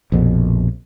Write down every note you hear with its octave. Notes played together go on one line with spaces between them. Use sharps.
A#1 F2 B2